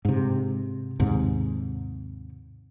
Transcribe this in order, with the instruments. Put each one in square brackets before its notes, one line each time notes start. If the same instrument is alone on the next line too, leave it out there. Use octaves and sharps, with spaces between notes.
[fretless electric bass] G#2 C3
D#2 G#2 C3